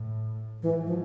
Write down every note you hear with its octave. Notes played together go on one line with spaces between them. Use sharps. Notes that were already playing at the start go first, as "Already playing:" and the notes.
Already playing: A2
G#2 E3
F3